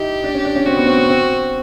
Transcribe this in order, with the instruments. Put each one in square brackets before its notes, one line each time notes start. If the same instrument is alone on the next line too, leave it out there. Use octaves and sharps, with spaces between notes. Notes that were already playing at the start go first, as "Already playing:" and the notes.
Already playing: [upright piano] D#4 E4 [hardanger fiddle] G4
[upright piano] D4
C#4
D4
C#4
[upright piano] C4 [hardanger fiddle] F#4
[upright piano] B3
C4
B3
C4